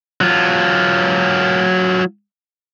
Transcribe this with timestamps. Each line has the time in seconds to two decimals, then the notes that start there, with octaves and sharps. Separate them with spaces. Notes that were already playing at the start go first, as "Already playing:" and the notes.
0.21 F#3 F4